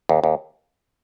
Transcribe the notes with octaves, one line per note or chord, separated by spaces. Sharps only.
D#2
D#2